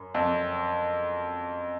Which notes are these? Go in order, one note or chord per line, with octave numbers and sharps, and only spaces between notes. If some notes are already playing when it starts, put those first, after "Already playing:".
Already playing: F#2
F2